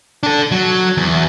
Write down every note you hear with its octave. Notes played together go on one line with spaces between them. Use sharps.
D4 A4
F#3
E2